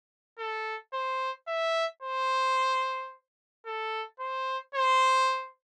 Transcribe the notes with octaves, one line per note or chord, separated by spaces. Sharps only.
A4
C5
E5
C5
A4
C5
C5